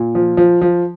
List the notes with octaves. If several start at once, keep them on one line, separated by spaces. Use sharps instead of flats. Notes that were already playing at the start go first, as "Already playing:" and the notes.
Already playing: A#2
F3
F3
F3